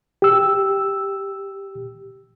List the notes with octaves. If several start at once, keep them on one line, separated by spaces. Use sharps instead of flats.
G4 E6